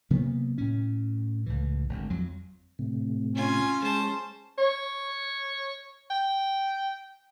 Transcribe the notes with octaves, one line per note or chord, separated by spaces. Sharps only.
C3 F#3 A#3 B3
A2 C#4
C#2 A2 E3
G#1 D2
F2 F#3
A2 C3
C#4 F4 G#5
G#3 C5 A5
C#5
G5